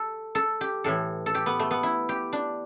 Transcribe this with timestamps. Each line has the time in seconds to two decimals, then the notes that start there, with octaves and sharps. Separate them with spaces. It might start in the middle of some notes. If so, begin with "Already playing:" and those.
Already playing: G4 A4
0.35 A4
0.61 G4
0.84 A2 E3 A4
1.26 A4
1.35 G4
1.46 B3
1.59 A3
1.71 B3
1.83 E4
2.09 G4
2.33 D4